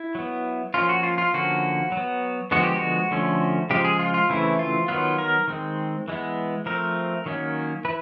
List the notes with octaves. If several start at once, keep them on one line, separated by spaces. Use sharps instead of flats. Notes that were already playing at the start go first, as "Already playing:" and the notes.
Already playing: E4
F#3 B3
F3 A#3 C#4 F4
F#4
F4
F4
D3 F3 A#3 C#4 F#4
F#3
B3
D3 F3 G#3 B3 F#4
G4
F#4
D3 F3 A3 C#4
C#3 F3 G#3 G4
G#4
F4
F4
C#3 E3 A3 C4 E4
F4
D#3 F#3 B3 F4
A#4
D#3 G#3 C4
E3 G#3 B3
F3 A3 C4 A#4
D#3 F#3 A#3 C#4
E3 B4